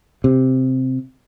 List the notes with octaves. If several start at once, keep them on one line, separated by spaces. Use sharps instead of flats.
C3